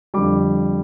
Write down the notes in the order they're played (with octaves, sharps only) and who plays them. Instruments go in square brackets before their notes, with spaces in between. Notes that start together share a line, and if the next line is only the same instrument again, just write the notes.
[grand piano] F2 D3 G3 D6